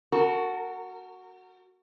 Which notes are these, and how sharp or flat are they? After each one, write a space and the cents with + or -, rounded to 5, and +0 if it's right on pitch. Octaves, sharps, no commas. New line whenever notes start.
F#4 +0 A#4 -35 A5 +0